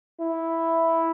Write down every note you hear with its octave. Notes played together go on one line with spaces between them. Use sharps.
E4